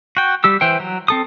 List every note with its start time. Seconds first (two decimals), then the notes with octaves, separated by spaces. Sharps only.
0.17 F#4 G5
0.44 G3 G4 E6
0.61 E3 C5 G5
0.80 F#3
1.08 C4 A4 D#6